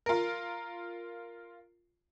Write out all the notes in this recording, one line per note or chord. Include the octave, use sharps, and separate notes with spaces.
F4 A#4